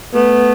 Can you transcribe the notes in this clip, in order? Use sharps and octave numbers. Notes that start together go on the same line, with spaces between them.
A3 B3